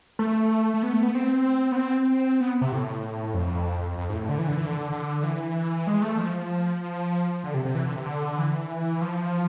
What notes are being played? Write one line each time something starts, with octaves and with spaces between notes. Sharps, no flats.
A3
A3
B3
A3
B3
C4
B3
C4
B3
C3
A2
F2
F2
G#2
A2
D3
E3
D3
E3
D3
D3
E3
G#3
A3
F3
D3
C3
C3
E3
D3
C3
D3
E3
F3